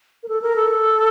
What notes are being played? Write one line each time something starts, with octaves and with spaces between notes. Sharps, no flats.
A#4
A4
A#4
A4